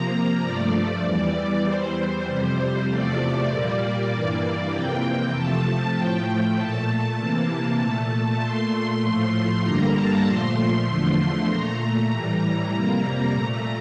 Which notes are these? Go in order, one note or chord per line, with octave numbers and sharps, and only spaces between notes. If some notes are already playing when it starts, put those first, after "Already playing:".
Already playing: C3 F3 A#3 A#5
G2 F3 A3 D5
E2 E3 G3
E2 E3 G3 C5
F2 C3 G3 C5
E2 C3 F3 A3 D5
A#2 G3 A#3 D5
G2 E3 A#3
F2 C3 E3 A#3 G5
C3 F3 A3 A5
A2 F3 A3 G5
A#2 A3 A5
C3 E3 A#3
A#2 A3
A#2 A3 C6
A2 F3 A3
G2 D3 G3 A#3 A#5
A5
A#2 F3 A3 C6
E2 D3 F3 A3
A#2 A3 A#5
A2 E3 G3
F2 C3 G3 A#3
A#2 A3